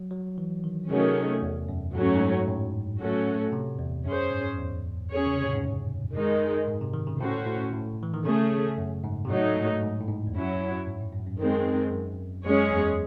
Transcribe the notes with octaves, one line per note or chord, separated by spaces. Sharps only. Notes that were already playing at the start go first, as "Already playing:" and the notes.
Already playing: F#3
F#3
E3
D#3
C3 D#3 F#3 A3 C#4 G#4
E2
F#2
G#2 F#3 A3 C#4
F#2
G#2
A2
F#3 A3 C#4 F#4 A4
C3
E2
F#2 C#4 G#4 C5
G#2
E2
C#4 G#4 C#5
C#3
C3
A2
G#2
F#2
D#3 G#3 D#4
G#2
C3
D#3
C#3
A2 C#4 F#4 A4 C5
A2
A2
E3
D#3
C#3 A3 C#4 G#4
F#2
G#2
C3
A2 F#3 A3 D#4
G#2
G#2
A2
G#2
E2
F#2 F#3 C#4 E4
G#2
A2
F#2
F#2
D#3 G#3 C4
F#2
F#2 G#3 C#4 G#4 C#5
E2